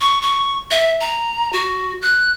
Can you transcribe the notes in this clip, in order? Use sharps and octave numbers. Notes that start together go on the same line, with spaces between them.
C#6
C#6
E5
A#5
F#4
F#6